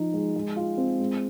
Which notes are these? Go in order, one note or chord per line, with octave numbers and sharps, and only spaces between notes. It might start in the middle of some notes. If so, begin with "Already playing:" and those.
Already playing: F3 D#4
G#3
G#3
F4
C4
G#3